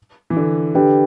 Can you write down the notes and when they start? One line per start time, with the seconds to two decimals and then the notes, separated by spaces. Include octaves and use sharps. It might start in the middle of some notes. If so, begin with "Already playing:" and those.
0.30 E3
0.37 D3
0.75 D3 D4 G4 B4 G5